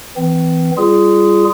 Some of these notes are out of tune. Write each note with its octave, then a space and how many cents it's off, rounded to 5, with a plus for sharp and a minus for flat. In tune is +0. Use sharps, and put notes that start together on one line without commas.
E3 +0 C4 -35
G3 +0 F4 -25 G#4 +0